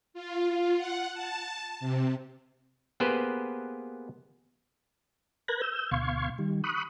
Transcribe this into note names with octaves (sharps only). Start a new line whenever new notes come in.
F4
F#5
A5
C3
A#3 B3 G4 G#4 B4 C5
A#4 B4 F#6 G#6 A#6
E6 G6
D2 B2 F5 C6 C#6 G#6
D#3 G3
B5 C#6 D#6 F#6